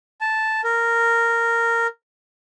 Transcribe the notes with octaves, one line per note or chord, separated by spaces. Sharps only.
A5
A#4